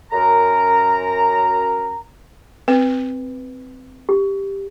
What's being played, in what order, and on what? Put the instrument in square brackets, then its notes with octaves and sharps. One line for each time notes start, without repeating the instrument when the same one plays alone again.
[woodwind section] F#2 A#4 A#5
[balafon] C4 [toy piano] B4
[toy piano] G4